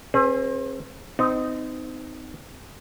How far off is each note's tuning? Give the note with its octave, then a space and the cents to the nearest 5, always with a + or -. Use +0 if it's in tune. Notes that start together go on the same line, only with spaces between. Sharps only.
C4 +40 G#4 +0 B4 +0
C4 -30 D#4 +0